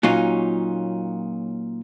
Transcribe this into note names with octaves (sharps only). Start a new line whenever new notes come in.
A#2 F#3 C#4 D#4 F4